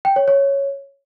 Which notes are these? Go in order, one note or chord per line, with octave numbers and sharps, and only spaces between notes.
G5
C#5
C#5